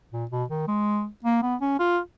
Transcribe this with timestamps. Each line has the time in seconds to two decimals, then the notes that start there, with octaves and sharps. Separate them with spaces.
0.12 A#2
0.31 B2
0.50 D#3
0.68 G#3
1.24 A#3
1.42 B3
1.61 C#4
1.79 F4